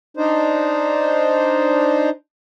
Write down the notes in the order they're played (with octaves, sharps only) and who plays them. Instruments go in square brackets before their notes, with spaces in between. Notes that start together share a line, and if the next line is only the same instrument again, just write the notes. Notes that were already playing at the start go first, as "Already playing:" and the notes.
[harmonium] D4 D#4 C5